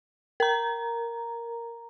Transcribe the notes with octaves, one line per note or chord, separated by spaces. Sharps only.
A#4 A#5